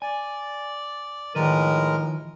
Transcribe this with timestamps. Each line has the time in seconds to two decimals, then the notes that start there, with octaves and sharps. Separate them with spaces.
0.02 D5 G#5
1.35 A2 D#3 F3 G#3 A#4 B4